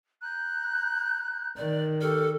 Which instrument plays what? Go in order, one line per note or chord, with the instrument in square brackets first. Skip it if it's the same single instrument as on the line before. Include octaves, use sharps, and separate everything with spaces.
[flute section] A#5 F#6 G6
[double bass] D#3 [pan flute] D5
[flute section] G4 C#6 F6 [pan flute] A4